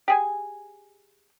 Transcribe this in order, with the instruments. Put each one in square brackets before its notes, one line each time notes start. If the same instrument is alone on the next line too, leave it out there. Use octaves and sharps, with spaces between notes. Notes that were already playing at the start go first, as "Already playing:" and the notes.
[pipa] G4 G#4 G#5